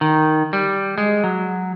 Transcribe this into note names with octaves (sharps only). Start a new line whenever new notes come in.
D#3
G3
G#3
F#3